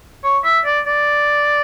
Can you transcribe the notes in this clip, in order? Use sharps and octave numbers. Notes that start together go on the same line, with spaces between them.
C#5
E5
D5
D5